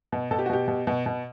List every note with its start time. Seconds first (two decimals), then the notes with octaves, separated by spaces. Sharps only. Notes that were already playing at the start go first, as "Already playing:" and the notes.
0.12 B2
0.31 B2 A4
0.39 G4
0.46 F#4
0.49 B2 G4
0.68 B2
0.87 B2
1.06 B2